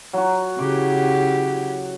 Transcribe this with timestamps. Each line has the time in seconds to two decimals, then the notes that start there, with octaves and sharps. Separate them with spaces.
0.13 F#3 F#4
0.59 C#3 E4 G4 D6